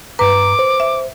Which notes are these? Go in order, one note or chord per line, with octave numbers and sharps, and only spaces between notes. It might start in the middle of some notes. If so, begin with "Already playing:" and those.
G2 B4 A#5 D6
C5
E5